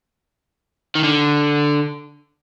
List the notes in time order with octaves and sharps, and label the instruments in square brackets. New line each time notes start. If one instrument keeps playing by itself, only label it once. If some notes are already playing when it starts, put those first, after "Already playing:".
[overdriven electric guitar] D#3
D3